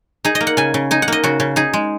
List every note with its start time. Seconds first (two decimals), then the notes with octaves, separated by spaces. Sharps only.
0.25 D#4 G#4
0.35 D#5
0.40 A#3
0.47 F#5
0.57 C#3 G#5
0.74 C#3
0.91 D#4 G#5
1.02 F#5
1.08 A#3 D#5
1.24 C#3 F#4
1.40 C#3
1.56 D#4 G#4
1.73 G#3